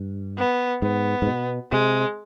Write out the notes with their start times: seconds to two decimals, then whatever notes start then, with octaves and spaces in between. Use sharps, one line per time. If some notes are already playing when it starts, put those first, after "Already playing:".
Already playing: G2
0.38 B3
0.82 G#2 B3
1.22 G#2
1.27 B2
1.72 C3 G#3